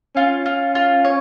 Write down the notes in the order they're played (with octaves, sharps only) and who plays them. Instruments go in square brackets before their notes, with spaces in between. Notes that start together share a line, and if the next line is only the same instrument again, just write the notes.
[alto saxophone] C#4 [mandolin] F4
[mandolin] F4
F4
C#5